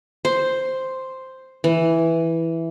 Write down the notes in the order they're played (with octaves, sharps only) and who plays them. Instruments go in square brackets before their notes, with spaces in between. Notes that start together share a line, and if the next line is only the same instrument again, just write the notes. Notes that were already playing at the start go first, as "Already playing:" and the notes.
[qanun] C5
E3